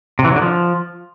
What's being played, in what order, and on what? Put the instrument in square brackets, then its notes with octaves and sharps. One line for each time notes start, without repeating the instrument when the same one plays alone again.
[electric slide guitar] C3
E3
F#3
D3
F3